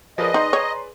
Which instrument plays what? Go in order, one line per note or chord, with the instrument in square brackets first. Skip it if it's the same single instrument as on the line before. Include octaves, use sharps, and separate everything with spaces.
[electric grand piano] F3 A#4 [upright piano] G#4 B4 D5 [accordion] D#5
[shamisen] D#4 [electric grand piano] A#5 C6
[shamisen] C#5